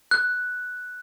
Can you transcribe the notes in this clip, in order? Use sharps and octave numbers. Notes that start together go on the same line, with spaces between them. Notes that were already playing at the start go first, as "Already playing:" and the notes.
F#6